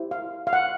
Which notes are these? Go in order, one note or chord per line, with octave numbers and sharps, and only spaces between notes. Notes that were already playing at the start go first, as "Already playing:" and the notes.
Already playing: E4 G4 C5
F5
F5
F#5